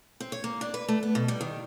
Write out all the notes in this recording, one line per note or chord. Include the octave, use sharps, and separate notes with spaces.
C4
C#5
A#3
D4
B4
A3
B3
B2
G3
D#3